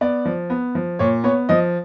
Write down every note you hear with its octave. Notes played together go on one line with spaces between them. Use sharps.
B3 D5
F3
B3
F3
A#2 C#5
B3 C#5
F3 D#5